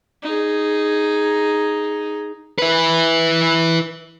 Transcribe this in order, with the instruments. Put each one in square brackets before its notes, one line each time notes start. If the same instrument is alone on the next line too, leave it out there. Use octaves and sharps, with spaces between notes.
[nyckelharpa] D#4 G#4
[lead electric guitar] E4 B4